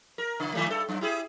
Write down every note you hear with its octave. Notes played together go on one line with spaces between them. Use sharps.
A#4
C#3
D#3 G3 A3
G2 A4
F#2
E4 G4 G#4